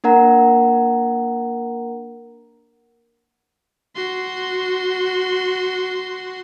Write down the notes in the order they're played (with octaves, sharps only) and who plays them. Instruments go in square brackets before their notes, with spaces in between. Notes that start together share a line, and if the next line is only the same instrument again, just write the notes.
[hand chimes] A#3 D4 A#4 F#5 A#5
[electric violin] F#4 C6